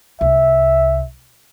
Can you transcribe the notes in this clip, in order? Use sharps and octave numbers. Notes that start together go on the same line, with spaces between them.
C2 E5